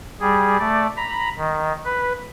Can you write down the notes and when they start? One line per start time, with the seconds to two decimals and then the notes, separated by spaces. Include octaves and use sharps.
0.21 G3 G#4
0.59 A3 D5
0.97 A#5 B5
1.37 D#3
1.85 B4